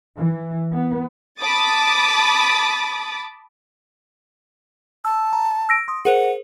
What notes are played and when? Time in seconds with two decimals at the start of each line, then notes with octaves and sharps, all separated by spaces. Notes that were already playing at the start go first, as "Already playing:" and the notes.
0.17 E3
0.73 B3
1.40 A5 B5 D6 D#6 A6
5.05 A5 E6
5.33 A#5
5.69 E6 A#6 D7
5.88 C6 D#6
6.05 G#4 A#4 C5 F#5